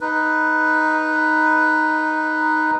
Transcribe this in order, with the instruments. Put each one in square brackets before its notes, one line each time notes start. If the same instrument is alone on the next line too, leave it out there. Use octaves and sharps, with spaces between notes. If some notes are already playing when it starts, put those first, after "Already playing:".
[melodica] D#4 B4